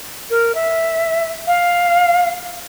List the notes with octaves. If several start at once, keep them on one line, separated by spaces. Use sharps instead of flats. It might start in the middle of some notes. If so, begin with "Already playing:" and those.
A#4
E5
F5